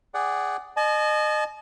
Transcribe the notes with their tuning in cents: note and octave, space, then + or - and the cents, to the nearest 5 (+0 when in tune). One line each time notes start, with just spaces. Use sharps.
G#4 -10 D5 -5 F#5 +20
D#5 -30 A5 -45